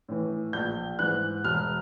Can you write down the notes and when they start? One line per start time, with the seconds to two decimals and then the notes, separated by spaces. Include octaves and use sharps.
0.09 A2 E3
0.53 A#1 G6
0.99 G#2 E3 F#6
1.44 E1 F6